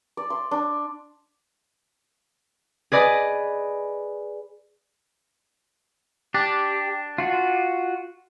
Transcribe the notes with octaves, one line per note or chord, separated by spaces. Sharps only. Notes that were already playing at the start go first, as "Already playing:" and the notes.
D5
C6
D4
G#4 B4 D5 D#5
D4 G4
F4 F#4